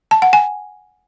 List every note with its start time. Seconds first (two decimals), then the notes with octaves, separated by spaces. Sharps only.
0.11 A5
0.22 F#5
0.33 G#5